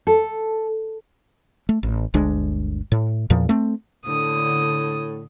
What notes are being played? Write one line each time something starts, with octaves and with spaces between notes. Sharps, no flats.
A4
A3
A1
G1 D2 G#3 D4
A2
E2 A#2 F3
A3 C4
A2 D3 D#6